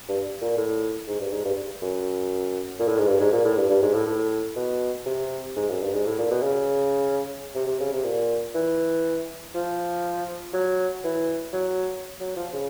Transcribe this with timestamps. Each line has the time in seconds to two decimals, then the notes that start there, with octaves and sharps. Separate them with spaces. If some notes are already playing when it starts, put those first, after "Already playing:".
0.09 G2
0.42 A#2
0.57 A2
1.08 G#2
1.21 G2
1.32 G#2
1.45 G2
1.82 F#2
2.79 A#2
2.88 A2
2.98 G#2
3.08 G2
3.20 G#2
3.32 A#2
3.45 A2
3.57 G2
3.70 G2
3.82 G#2
3.94 A2
4.07 A2
4.56 B2
5.06 C3
5.56 G#2
5.70 F#2
5.83 G2
5.93 G#2
6.06 A2
6.18 A#2
6.31 B2
6.43 C#3
7.55 C3
7.67 C3
7.80 C#3
7.93 C3
8.04 A#2
8.55 E3
9.55 F3
10.54 F#3
11.04 E3
11.53 F#3
12.20 F#3
12.36 F3
12.54 C#3